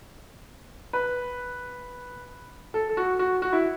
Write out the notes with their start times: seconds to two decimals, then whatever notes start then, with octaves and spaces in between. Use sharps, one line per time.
0.93 B4
2.74 A4
2.89 A4
2.97 F#4
3.19 F#4
3.42 F#4
3.53 E4